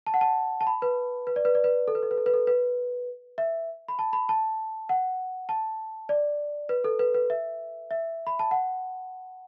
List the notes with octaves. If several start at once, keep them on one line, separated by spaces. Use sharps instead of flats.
A5
F#5
A5
A5
B5
B4
B4
D5
B4
D5
B4
A4
B4
A4
B4
A4
B4
A4
B4
E5
B5
A5
B5
A5
F#5
A5
D5
B4
A4
B4
B4
E5
E5
B5
A5
F#5